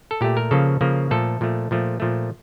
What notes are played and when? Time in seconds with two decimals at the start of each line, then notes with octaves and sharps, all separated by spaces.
0.11 A4
0.21 A#2 A3 G4
0.37 A#4
0.51 C#3 F3 A#3 A4
0.81 C#3 F3 A#3
1.11 A#2 F3 A3 A4
1.41 A#2 F3 A3
1.71 A#2 F3 A3
2.00 A#2 F3 A3